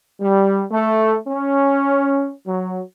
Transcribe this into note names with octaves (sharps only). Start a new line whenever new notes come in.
G3
A3
C#4
F#3